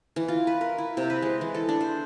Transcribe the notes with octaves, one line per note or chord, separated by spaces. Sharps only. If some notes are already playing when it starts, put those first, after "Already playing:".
E3
F4
B4
A#4
E4
C3
B4
G#3
E3
A4
D4
C5